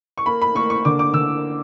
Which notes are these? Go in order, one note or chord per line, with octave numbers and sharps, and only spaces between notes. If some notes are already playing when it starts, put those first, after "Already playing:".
C#6
A#3 B5
B5
A#3 C#6
C#6
D3 D6
D6
D3 E6